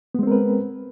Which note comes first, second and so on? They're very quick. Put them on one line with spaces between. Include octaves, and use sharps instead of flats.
B3 G#3 C4 A#4 B4